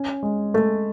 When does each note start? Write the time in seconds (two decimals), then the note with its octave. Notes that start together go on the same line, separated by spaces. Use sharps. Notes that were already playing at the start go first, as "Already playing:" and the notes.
Already playing: C#4
0.23 G#3
0.54 G#3 A3